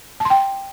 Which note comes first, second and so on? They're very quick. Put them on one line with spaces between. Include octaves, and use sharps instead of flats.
A5 C6 G5